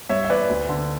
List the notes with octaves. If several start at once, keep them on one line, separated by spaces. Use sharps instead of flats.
G2 C#5 E5
E5
E3 B4 D5
D2
D3